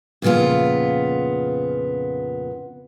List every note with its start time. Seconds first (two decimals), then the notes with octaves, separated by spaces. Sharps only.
0.22 F2 A#2 C#3 B3 F4